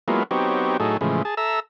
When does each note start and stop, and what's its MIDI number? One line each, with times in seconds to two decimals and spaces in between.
0.08 0.23 54
0.08 0.23 56
0.08 0.23 58
0.08 0.23 59
0.08 0.23 64
0.08 0.23 65
0.31 0.77 54
0.31 0.77 59
0.31 0.77 60
0.31 0.77 63
0.31 0.77 67
0.31 0.77 73
0.80 0.97 45
0.80 0.97 54
0.80 0.97 63
0.80 0.97 68
0.80 0.97 69
1.01 1.23 45
1.01 1.23 49
1.01 1.23 52
1.01 1.23 53
1.01 1.23 56
1.25 1.35 68
1.25 1.35 81
1.37 1.60 69
1.37 1.60 76
1.37 1.60 82
1.37 1.60 88